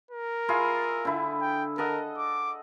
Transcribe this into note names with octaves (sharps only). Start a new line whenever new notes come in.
A#4
E4 F4 G#4
D3 E4
G5
A4 A#4 D#5 F#5
D6